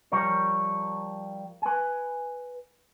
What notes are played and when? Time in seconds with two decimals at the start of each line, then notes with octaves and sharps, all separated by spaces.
0.12 F3 G3 A#4 C#5
1.62 B4 G#5